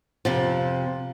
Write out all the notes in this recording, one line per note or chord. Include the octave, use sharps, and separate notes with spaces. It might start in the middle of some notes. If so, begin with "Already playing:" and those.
F2 C3 F3